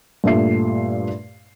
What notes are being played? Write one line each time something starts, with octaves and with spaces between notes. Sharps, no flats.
G2 A#2 A3 E5 C7